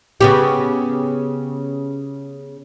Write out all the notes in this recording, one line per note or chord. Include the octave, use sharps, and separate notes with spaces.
C#3 B3 G4